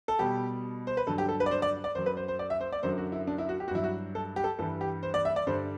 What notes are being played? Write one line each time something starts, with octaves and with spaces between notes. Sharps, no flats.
A4
B2 G3 G4
C5
B4
G2 D3 F#3 A4
G4
A4
B4
D5
C5
D5
D5
F#2 F#3 C5
B4
C5
C5
D5
E5
C5
D5
F#2 D3 F#3 C5
F#4
E4
D4
E4
F#4
G4
F#4
G2 F#3 E4
F#4
A4
G4
A4
G2 E3 G3 A4
G4
C5
D5
E5
D5
G2 D3 G3 C5